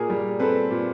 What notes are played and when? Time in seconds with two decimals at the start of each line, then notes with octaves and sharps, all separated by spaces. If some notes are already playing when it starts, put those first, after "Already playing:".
Already playing: A#2 G#4 A#4
0.10 G3
0.40 C4 A4 B4
0.71 A#2